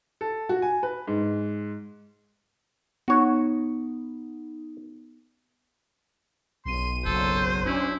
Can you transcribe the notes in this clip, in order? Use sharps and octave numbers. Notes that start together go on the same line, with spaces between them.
A4
F#4
G#5
B4
G#2
B3 D#4 F#4 C#5
B1 C6 D#7
F#1 F#3 A4 C5
C#4 D4 E4